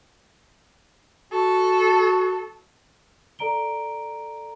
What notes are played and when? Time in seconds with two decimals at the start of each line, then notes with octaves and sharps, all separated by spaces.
1.33 F#4 A4
3.39 A4 D5 A#5 D7 G7